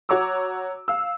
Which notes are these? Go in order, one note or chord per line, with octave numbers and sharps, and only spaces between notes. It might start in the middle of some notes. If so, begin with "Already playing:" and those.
F#4 C#5 A#5 D6 E6
F5 E6